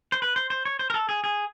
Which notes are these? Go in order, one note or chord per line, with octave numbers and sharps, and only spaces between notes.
C5
B4
C5
C5
C#5
C5
A#4
A4
G#4
G#4